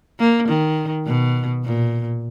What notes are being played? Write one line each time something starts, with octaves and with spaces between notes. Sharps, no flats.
A#3
D#3
B2
A#2